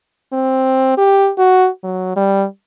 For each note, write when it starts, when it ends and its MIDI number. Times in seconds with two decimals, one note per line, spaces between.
0.33 0.97 60
0.98 1.30 67
1.38 1.68 66
1.84 2.15 54
2.16 2.46 55